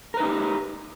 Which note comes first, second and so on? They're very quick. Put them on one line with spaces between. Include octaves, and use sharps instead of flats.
A#4 B4 D#4 G4